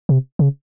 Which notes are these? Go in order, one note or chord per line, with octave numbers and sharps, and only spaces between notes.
C3
C#3